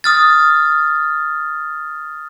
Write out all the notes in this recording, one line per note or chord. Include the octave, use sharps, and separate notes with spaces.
D#6 F6 A6